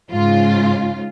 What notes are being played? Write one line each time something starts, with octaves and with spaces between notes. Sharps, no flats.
G#2 C#3 F4